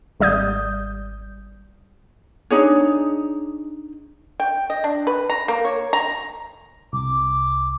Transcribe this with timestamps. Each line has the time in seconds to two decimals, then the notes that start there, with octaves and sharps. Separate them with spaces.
0.20 G#1 G3 D5 D#6 G6
2.51 D4 D#4 G#4 C#5
4.40 G5
4.70 D#5
4.84 D4
5.07 B4
5.30 A#5
5.48 A#3
5.65 C#5
5.93 A#5
6.93 C2 D6